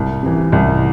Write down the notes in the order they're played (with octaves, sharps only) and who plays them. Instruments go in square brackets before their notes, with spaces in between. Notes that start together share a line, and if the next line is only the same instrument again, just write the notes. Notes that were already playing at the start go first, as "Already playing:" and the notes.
Already playing: [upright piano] C2
C3 E3
C2